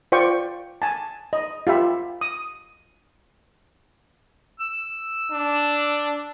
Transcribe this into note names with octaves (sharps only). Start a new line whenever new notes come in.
F4 C5 D5 G5 C#6
G#5 A5
D#5
F4 G4 E5 B5
D#6
E6
D4